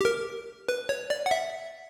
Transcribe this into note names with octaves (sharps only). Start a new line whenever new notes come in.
G4
A#4
B4
C#5
D5
F#5
E5